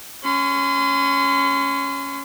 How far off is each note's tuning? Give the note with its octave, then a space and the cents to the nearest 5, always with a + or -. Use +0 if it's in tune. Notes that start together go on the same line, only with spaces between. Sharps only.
C#4 +0 C6 -40